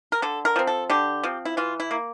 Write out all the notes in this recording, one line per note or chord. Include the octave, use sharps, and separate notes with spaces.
A#4
D3 A4
A#4
F3 C4
A4
D3 G4
F3 C4
E4
E3 F4
E4
A#3